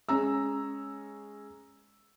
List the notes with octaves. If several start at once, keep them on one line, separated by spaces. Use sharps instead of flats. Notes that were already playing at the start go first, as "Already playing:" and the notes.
G#3 C#4 G#4 A#5 E6